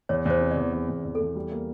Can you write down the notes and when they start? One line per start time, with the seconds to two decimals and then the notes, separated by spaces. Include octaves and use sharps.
0.09 E2 C#5
0.26 E2 C5
0.41 C3
0.51 D5
0.57 E2
0.73 E2
0.89 E2
1.05 E2
1.15 A4
1.20 E2
1.36 G3
1.52 A#3